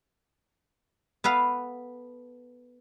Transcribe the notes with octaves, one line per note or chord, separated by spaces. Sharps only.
B3 A4 B4 F5